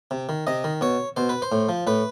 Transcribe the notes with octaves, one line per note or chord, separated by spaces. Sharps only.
C3
D#3
C3 D#5
D#3
B2 C#5
B2 C5
B4
C5
A2
F3
A2 B4